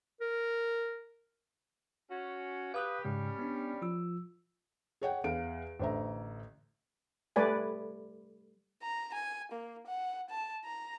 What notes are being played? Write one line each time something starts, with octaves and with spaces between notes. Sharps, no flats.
A#4
C#4 F#4
G4 B4 F5 D#6 F#6
G#2 C#3 G3 G#3 C#4
B3 D4
F3 F4 E6
G#4 C#5 F#5 G5
E2 F5 D7
A1 D3 C5 E5 A#5
G3 A3 B4 D5 G#5
A#5
G#5
A#3
F#5
A5
A#5